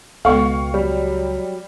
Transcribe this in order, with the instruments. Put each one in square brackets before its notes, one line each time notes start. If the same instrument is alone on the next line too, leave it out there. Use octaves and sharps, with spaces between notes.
[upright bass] C#2 [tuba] B2 [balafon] G#3 B3 A4 [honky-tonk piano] F5 G5 C#6
[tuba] F#3 [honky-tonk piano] G3